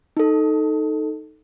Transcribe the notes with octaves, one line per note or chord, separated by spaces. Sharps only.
D#4 A4